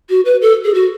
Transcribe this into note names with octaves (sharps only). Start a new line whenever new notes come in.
F#4
B4
A4
G#4
F#4